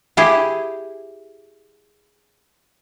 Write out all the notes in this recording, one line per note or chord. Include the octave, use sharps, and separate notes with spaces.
E4 G4 G#4